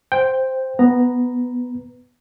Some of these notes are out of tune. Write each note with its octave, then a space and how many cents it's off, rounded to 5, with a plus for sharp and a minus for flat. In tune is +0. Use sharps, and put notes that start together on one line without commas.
C5 +0 G5 +0
B3 +0 B4 +0 A#5 +0